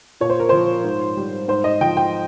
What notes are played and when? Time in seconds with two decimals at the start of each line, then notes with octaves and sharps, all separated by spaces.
0.21 A#2 C#5
0.30 C5
0.40 A#4
0.49 F3 C5
0.84 G#2
1.17 G3
1.48 G#2 C5
1.64 D#5
1.81 F3 G5
1.97 G5